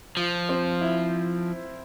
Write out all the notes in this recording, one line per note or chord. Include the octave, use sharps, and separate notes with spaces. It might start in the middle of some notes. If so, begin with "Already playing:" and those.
F3 F4
C4
E4